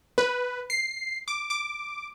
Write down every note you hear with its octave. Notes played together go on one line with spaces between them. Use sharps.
B4
C7
D6
D6